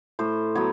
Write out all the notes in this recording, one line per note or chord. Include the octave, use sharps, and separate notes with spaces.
A2 C5
F#3 B3 C#5